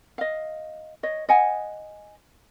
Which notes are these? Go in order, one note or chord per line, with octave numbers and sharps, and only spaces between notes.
D#5 F5
C#5 D#5
D#5 F#5 G#5